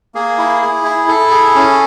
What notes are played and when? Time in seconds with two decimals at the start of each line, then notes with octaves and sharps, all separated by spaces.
0.15 A#3 G#4
0.38 E4
0.62 G#4
0.85 E4
1.08 E4 A4
1.31 G#4
1.55 C#4